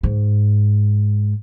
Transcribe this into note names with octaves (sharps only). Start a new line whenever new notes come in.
G#2